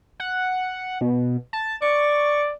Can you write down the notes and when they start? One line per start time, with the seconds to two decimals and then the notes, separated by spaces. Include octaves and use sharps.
0.20 F#5
1.01 B2
1.53 A5
1.82 D5 C#6